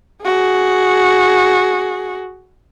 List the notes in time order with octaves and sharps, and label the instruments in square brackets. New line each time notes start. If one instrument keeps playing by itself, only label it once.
[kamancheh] F#4 G#4